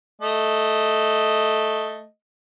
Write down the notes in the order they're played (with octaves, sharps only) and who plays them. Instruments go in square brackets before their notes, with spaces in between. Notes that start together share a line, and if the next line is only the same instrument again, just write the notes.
[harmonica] A3 D#5